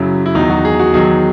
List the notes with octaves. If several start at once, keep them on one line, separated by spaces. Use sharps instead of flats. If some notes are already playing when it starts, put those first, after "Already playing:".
Already playing: F#2 C#3 F#3 E4
E4
E2 D#3 F#3 D#4
F#4
G#4
F#4
E2 D#3 F#3 G#4